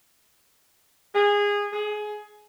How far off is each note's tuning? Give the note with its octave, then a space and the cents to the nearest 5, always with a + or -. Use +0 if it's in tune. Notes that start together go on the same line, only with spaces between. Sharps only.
G#4 -20
G#4 +20